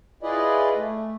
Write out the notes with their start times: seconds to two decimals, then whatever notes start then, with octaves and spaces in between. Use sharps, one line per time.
0.23 E4 F4 G#4 B4 D5 D#5
0.76 A3